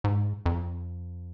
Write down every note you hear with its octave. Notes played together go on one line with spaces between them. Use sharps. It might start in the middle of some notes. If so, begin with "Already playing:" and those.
G#2
F2